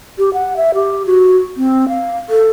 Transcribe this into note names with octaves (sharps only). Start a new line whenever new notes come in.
G4
F#5
E5
G4
F#4
C4
F5
A4